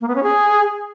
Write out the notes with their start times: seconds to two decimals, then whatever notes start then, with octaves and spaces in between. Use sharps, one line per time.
0.01 A#3
0.08 B3
0.16 C#4
0.23 G#4